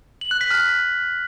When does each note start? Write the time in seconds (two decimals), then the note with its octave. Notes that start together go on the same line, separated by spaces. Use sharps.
0.21 F#7
0.31 F#6
0.41 B6
0.51 F6